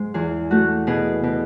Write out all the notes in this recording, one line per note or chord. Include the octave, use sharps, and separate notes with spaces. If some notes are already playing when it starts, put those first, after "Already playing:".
Already playing: G#2 G#3
E2 G#4
A3 F#4
B2 G#4
B2